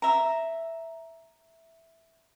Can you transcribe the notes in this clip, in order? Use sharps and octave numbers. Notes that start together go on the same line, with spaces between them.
E5 A#5